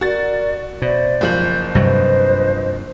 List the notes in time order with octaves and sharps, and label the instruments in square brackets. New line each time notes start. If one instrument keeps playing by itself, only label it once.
[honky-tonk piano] F#4 A6 [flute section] A#4 D5
[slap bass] B2 [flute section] C5 D5 E5
[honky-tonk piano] F#1 F3 F#7 [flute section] G6
[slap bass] G2 C3 F#3 [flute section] B4 C5 D#5